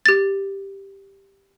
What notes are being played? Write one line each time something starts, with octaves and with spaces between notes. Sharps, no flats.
G4 A6